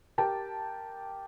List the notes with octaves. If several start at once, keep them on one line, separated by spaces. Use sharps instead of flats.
G4 A#4 G5 A5